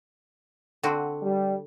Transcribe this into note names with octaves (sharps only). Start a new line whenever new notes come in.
D3 C4 F#4
G3